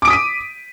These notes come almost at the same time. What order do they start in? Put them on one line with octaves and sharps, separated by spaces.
D6 D7 D#6 B6 D#7